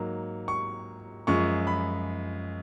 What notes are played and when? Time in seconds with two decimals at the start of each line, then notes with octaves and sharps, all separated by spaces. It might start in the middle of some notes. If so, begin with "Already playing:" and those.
Already playing: G#2 F#3 A#3
0.48 C#6
1.27 F#2 F3 G#3 C#6
1.67 B5